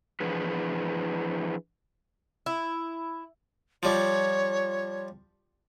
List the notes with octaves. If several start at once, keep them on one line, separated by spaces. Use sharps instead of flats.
E3 F3 D4 G#4 B4
E4
F3 G3 C#5